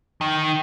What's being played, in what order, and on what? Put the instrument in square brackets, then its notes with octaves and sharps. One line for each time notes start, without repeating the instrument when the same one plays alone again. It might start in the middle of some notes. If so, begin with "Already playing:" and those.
[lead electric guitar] D#3